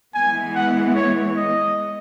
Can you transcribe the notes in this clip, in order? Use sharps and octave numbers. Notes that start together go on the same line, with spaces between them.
E3 G#3 B3 G#5
F#5
C#5
D#5